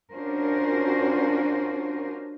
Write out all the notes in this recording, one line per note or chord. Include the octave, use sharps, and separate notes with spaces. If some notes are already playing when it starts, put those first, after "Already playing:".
C#4 D4 F4 F#4 A#4 C5